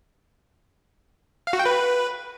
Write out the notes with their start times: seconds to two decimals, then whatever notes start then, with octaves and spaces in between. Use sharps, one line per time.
1.47 F5
1.53 F#4
1.59 G5
1.66 B4